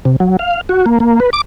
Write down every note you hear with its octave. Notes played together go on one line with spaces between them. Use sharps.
C3
F#3
F5
F#4
A#3
A#3
B4
D6